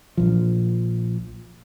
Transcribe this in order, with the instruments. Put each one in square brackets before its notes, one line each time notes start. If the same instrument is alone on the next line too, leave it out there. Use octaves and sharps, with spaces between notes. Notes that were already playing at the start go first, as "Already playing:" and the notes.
[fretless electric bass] A#1 F3